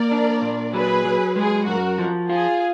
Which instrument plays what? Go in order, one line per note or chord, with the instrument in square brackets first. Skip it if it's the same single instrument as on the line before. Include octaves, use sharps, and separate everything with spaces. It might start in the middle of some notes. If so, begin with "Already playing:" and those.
Already playing: [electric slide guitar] A#3 [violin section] A#4 D5
[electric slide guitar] D4
A#2
[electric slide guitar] F#3 [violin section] G#4 B4
[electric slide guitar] F#3
[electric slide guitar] G#3 [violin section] G#4
[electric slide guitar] F#2 [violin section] F#4 A#4
[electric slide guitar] F3
[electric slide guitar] F4 [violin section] G#4